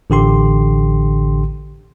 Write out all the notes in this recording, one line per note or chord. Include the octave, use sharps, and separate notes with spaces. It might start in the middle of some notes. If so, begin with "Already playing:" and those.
A1 D3 G4 C6